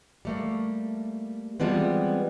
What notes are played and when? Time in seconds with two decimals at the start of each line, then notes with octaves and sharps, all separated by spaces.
0.25 G3 A3 A#3
1.60 E3 F3 G3 G#3 B3 C4